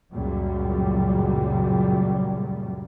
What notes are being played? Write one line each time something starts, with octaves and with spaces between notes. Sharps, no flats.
C#2 F#2 A#2 F#3 G3